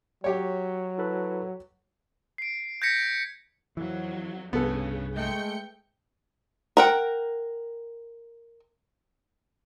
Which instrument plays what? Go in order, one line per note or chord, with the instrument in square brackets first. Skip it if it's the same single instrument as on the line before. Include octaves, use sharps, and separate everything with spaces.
[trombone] F#3 [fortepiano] G4 C#5
[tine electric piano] E4 A4 B4
[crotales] C7 D7
G6 G#6 A#6 B6 C#7
[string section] F2 F#3 [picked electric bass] E3
[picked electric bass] C2 G2 [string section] C#3 [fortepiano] B3 A4
[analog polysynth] G#3 A3 [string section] G5 G6 C#7
[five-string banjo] A#4 F#5 G5